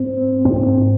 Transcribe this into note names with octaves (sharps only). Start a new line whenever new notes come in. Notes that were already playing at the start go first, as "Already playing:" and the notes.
Already playing: G#2 C4
G#2 C4